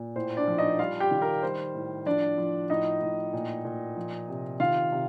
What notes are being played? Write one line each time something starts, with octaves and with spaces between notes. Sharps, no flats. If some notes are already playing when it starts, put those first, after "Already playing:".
Already playing: A#2
A2 C5
D4 D5
F3
D#4 D#5
G3 F4 F5
G4 G5
D#3
A#4
G3 C5
A2
F3 D4 D5
F3
A2 D#4 D#5
A2
A#2
A#2
F3
C3
D#3 F4 F5
C3